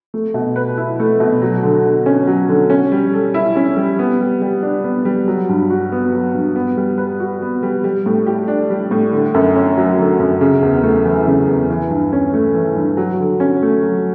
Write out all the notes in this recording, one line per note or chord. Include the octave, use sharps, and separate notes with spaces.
A3
B2
B4
E4
A3
B2
F#3
D3
D3
C#4
F#3
D3
C#4
G3
A4
E4
C#4
G3
B3
G3
G3
D4
B3
G3
F#3
G2
F#4
B3
F#3
G2
B3
G3
B4
F#4
B3
G3
G3
A2
G4
D4
G3
A2
D3
F#2
C#4
F#3
D3
F#2
C#3
E2
A3
E3
C#3
E2
E3
G2
C#4
A3
E3
G2
F#3
D3
C#4
A3
F#3